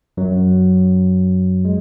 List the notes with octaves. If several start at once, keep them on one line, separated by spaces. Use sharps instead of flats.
F#2 F#3
G#3